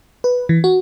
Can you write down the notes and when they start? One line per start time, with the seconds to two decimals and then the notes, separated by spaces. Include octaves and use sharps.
0.24 B4
0.49 E3
0.64 F#4